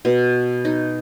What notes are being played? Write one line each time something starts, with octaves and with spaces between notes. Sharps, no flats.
B2
D#4